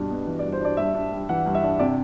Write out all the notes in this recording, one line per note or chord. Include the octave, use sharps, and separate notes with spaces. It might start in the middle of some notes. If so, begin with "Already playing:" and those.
Already playing: G2 B2 D4
B3
E3
D5
G2
C5
D4 D5
G2 E5
D4
G3
E3 F#5
G2
E5
D4
C3 D5